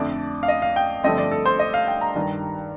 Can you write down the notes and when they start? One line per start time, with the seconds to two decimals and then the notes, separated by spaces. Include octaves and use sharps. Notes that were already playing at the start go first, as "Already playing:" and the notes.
Already playing: F2 D3 A3 D4 D5
0.43 F5
0.48 D#5
0.62 F5
0.76 G5
1.04 G2 D3 F3 A3 C4 D#5
1.18 D5
1.31 A4
1.45 C5
1.59 D#5
1.74 F5
1.88 G5
2.01 A#5
2.15 G2 D#3 G3